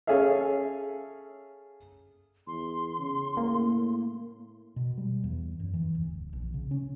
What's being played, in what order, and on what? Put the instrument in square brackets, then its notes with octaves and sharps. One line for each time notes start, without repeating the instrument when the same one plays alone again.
[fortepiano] C#4 G#4 A4 E5 F5
[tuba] E2 [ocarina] C6
[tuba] C#3
[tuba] A2 [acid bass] A#3
[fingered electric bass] B2
G3
E2
F#2
E3
D1
A#1
C#3
C#4